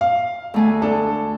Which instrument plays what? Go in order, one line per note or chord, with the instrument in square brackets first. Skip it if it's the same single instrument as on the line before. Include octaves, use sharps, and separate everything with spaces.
[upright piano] F5
[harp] D2 A3 G#5
[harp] D4 [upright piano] A4